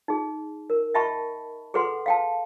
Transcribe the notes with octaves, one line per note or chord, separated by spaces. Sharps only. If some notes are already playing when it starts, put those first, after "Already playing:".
D#4 G#4
A#4
D#5 E5 G5 A5 B5 C#6
G#4 A4 B4 F#5 C6
F5 G5 A5